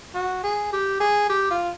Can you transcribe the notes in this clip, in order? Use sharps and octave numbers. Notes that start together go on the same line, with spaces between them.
F#4
G#4
G4
G#4
G4
F4